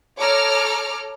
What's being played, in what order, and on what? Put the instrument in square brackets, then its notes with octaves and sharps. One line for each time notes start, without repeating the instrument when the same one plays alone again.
[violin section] A4 C#5 A#5 D6 F6